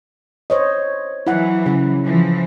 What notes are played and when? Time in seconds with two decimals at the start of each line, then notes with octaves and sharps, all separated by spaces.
0.50 C5 C#5 D#5
1.27 E3 F#3 E4 F#5
1.66 C#3
2.04 E3 F3